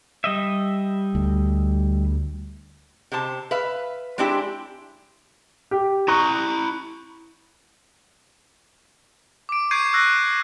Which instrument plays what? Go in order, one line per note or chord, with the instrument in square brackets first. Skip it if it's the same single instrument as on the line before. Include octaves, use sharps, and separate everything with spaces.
[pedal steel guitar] G3 D#5 E5
[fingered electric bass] D2
[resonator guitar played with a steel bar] C3 G4 C5 A5
B4 E5 F5
G#3 C4 D4 E4 G4
[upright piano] G4
[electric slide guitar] E4 A#5 [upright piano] C#6 F#6
[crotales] D6 D7
C#6 G6 G#6 C7 D7 D#7
C#6 E6 F#6 A#6